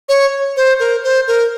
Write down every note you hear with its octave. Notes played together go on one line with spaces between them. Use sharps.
C#5
C5
A#4
C5
A#4